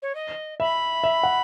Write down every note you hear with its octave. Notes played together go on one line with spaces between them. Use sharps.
C#5
D#5
E5 B5
E5
F#5